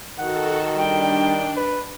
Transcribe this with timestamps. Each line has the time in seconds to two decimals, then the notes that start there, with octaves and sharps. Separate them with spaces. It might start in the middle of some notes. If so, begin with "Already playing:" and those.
0.19 D#3 F#4 A4 F#5
0.76 G3 D4 G5
1.57 B4